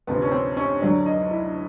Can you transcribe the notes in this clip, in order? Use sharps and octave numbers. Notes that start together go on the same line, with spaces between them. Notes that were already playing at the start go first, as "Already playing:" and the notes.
D2 C3 F3 B3
C#4
C4
C#4
D2 D3 F#3 D4
D#4
E4